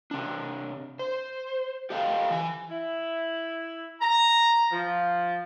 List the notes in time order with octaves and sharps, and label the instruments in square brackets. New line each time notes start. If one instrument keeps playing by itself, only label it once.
[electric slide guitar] C3 D4
C5
G4 A4 D#5 F5 G5
E3 G#5
[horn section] E4
A#5
F3